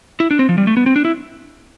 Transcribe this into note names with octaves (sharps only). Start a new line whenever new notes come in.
E4
D4
C4
F3
G3
A3
B3
C4
D4
E4